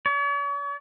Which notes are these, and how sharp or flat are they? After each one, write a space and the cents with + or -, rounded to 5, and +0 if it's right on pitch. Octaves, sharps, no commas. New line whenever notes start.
C#5 +45